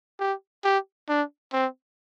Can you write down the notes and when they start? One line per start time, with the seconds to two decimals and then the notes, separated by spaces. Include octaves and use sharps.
0.20 G4
0.65 G4
1.09 D4
1.53 C4